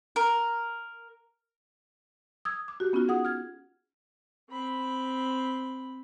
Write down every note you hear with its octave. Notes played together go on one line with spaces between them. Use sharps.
A#4
D#6 E6 G#6
D6
F#4 G4
B3 C#4 D#4 F4 F#4
G#4 F#5 D#6
F6 G#6
C4 B5